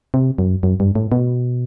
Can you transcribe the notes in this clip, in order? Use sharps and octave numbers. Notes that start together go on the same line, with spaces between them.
C3
F#2
F#2
G2
A2
B2